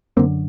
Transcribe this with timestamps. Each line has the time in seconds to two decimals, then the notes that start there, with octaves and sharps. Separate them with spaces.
0.17 F#2 D3 A#3 C4